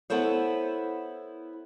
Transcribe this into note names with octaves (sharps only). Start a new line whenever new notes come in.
B3 E4 A4 C5 C#5